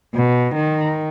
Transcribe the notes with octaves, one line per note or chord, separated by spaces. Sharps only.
B2
D#3